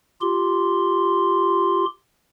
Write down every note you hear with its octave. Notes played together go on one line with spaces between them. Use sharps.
F4 G4 C6